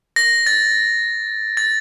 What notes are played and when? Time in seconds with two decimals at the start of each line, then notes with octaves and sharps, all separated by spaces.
0.16 A#6
0.46 A6
1.57 A6